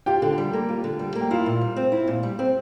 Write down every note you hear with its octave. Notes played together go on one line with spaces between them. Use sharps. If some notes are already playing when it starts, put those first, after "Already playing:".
F4 G4 G5
D3
G3
A#3
F4
D3
G3
A#3
G5
E4 F4 F5
A#2
G3
C4
E4
A#2
G3
C4